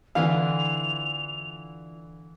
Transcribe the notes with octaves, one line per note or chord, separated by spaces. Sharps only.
D3 E3 E4 F4 F5 F7